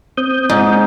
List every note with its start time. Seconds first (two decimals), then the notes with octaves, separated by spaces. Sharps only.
0.17 C4 D#6 G6
0.50 G#2